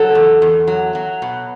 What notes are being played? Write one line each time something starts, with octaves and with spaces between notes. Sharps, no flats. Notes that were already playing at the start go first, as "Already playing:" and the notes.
Already playing: F#3 A4
E2
E2
F#3
F#3
B2